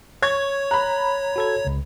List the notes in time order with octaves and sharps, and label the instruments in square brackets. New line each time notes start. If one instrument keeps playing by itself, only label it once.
[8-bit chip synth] C#5 [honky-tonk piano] C#6 G#6
[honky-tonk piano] A#5 B5 [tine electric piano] F#6
[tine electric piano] F#4 A4 G#6
C#2 C#3